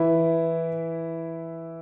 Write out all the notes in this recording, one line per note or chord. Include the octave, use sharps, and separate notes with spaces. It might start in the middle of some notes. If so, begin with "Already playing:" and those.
Already playing: E3 E4